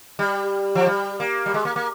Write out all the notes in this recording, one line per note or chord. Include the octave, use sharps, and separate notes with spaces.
G3
F3
G3
A#3
G3
G#3
A#3
A#3